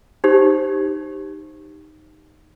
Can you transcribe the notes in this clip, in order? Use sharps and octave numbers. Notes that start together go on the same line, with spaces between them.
D#4 G4 C5